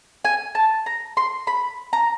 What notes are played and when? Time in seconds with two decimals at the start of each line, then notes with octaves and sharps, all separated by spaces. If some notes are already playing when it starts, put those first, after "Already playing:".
0.25 G#5
0.55 A5
0.86 A#5
1.17 C6
1.47 B5
1.93 A#5